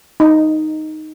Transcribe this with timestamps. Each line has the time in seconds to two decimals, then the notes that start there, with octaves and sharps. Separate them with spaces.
0.20 D#4